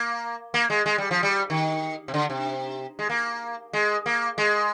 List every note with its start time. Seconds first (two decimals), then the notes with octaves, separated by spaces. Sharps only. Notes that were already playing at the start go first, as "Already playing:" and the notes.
Already playing: A#3
0.54 A#3
0.70 G#3
0.86 G#3
0.98 G3
1.11 F3
1.23 G3
1.50 D#3
2.08 C3
2.14 D3
2.30 C3
2.99 G#3
3.10 A#3
3.73 G#3
4.06 A#3
4.38 G#3